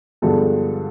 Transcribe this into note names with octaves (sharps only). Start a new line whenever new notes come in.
G2 D3 F3 G#3 B3 A4